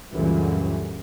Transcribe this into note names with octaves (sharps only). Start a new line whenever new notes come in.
C#2 F#2 A#2 D3 E3 G3